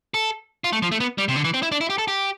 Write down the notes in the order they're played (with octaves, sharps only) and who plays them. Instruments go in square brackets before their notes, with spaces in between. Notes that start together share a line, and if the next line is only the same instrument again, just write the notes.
[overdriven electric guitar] A4
F4
A3
F3
A3
B3
G3
C3
D3
E3
C4
E4
D4
E4
G4
A4
G4